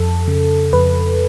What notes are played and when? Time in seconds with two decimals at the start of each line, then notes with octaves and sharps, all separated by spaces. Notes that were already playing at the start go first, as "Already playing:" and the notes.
Already playing: F2 A4
0.27 C#3
0.73 F2 B4